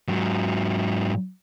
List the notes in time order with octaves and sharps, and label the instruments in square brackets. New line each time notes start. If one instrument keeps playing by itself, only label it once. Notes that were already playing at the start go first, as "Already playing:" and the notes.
[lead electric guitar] G#2 F#3